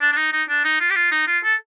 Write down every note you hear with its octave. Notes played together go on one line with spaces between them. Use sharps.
D4
D4
D#4
D#4
D4
D#4
F4
G4
F4
D#4
F4
A4